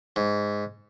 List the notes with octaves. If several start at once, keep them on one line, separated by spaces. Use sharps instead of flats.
G#2